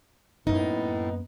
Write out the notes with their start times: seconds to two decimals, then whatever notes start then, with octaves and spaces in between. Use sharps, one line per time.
0.47 F#2 A2 A#3 B3 D#4